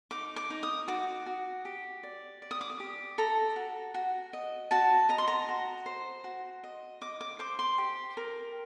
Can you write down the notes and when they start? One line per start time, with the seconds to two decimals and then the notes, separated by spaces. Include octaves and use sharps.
0.11 D#4 D6
0.36 D6
0.50 D#4
0.63 D#6
0.88 F#4 D6
1.26 F#4
1.65 G4
2.03 D5
2.42 D5
2.51 D#6
2.61 D6
2.70 D#6
2.80 G4
3.18 A4 A#5
3.56 F#4
3.94 F#4
4.33 D#5
4.71 F#4 A5
5.09 D#5 A#5
5.18 C6
5.28 A#5
5.49 F#4
5.86 C5
6.24 F#4
6.64 D#5
7.01 D#5 D6
7.21 D6
7.39 C5 D6
7.59 C6
7.78 G4
8.17 A#4